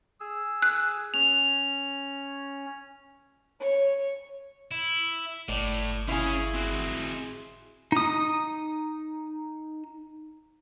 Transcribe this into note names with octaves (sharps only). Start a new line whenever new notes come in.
G#4 E6
F#6
C#4 F7
C#5
E4
G1 A2 D5
C#4 E4 G#4 F5
C4 F#4
D#4 D#6